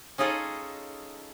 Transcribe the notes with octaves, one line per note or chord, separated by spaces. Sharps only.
C#4 D#4 F4 G#4 A4 D#5